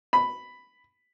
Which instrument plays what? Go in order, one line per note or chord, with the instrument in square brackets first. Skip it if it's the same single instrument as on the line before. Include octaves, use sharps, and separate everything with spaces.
[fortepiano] B5